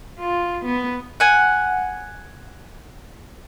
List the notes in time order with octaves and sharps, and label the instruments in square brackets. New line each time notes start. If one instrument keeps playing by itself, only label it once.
[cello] F4
B3
[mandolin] F#5 G#5